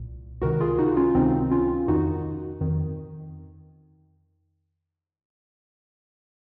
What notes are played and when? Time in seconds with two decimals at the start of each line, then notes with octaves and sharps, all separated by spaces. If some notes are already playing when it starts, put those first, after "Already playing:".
Already playing: C2 A#2
0.42 C#2 C3 D#3 F#4 A#4
0.60 F4 G#4
0.78 D#4 F#4
0.97 C#4 F4
1.15 C#2 C3 D#3 C4 D#4
1.51 C#4 F4
1.88 F2 D#3 D#4 F#4
2.61 F2 D#3